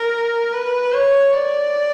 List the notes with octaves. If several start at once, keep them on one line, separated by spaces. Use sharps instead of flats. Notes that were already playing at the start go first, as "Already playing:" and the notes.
Already playing: A#4
B4
C#5
D5